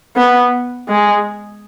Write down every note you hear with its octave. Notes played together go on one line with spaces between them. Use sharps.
B3
G#3